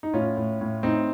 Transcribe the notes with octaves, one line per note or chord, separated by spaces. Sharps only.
D#4
A2 C#4 F4
A2
A2
A2 C4 D#4